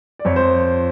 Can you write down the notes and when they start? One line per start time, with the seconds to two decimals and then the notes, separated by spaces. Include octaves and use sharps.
0.19 D5
0.25 F2 C#5
0.36 C5